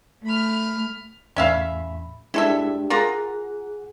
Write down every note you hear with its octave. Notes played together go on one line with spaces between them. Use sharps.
A3 B5 F6
E2 A2 C#4 E5 F5 B5
G#3 D4 E4 G4 A4 E5
F4 G#4 A#4 F#5 A#5